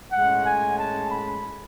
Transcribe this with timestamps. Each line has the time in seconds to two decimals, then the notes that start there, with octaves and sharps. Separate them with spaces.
0.11 A2 G#3 C#4 F#5
0.44 G#5
0.77 A5
1.10 B5